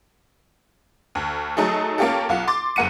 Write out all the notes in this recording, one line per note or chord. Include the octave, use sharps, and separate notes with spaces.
D2
F#3 A3 D#4 G#4 A4
A#3 C#4 F4 G4 A4
B1 F4 F#5
C6 D6 A6
F#1 A#3 F#5 C#7 D#7